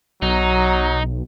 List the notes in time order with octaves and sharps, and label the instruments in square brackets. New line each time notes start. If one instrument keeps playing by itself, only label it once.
[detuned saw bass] B1 [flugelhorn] F#3 [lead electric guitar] D#4